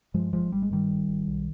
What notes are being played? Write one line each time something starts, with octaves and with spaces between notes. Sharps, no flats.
G2 F3 G#3
G#1 F3 G#3
G#1 G3
G#3
G2 D#3 G3
G#1
G#1
B1